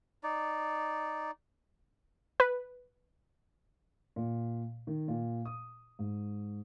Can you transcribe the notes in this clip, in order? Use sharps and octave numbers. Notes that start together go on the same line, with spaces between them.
D#4 D5
B4
A#2
D#3
A#2
D#6
G#2